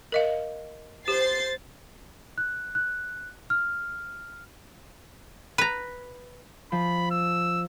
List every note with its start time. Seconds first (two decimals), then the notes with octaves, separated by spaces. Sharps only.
0.12 A#4 D#5 F5
1.08 G4 C5 A6 C7
2.38 F#6
2.75 F#6
3.50 F6
5.58 B4 A#5
6.72 F3 B5
7.11 E6